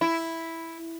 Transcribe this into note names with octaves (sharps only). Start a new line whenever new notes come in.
E4